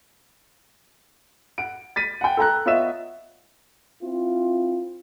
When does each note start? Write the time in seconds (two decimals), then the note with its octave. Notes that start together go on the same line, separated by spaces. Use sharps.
1.58 F#5 D7
1.96 A6 B6 D#7
2.21 F#5 G5
2.37 A4 G5 A#5 F#6
2.66 B3 F4 C#5 D#5 E5 E7
4.03 C4 E4 F4